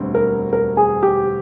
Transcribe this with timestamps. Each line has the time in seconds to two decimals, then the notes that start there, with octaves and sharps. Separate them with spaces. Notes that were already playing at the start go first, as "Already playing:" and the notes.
Already playing: E1 D2 D3 G3 C4
0.15 A#4
0.53 A#4
0.77 G#4
1.03 G4